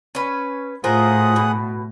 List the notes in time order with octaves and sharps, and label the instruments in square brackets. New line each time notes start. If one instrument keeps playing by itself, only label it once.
[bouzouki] C#4 B4
[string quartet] A2 [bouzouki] F4 A#4 C5 [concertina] G#4 F#5 D#6
[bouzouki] B2